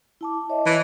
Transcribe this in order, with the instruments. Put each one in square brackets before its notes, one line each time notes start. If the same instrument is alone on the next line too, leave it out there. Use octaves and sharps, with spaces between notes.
[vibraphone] E4 A5 D6
C#5 D#5 E5
[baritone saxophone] E3